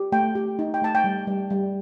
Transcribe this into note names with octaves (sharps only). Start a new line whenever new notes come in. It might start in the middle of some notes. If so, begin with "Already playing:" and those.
Already playing: G4
A3 G5
G4
D#4
G5
A3 A5
G5
G3
G3
G3